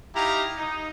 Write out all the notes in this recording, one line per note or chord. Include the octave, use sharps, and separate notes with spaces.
D#4 E4 G4 F5 A#5
D#4